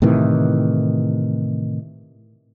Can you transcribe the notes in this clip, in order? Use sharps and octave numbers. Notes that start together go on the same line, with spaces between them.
A2 C3 D#3 E3